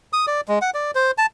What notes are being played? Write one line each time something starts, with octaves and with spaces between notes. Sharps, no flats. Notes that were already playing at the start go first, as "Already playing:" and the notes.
D#6
D5
G#3
F#5
D5
C5
A5